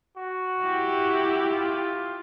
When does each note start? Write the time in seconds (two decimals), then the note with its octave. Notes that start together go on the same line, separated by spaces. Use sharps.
0.17 F#4
0.62 E4 G4
1.51 F4